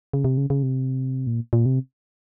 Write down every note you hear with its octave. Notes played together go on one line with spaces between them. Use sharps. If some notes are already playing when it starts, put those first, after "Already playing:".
C#3
C3
C#3
C#3
C3
A#2
A#2
C3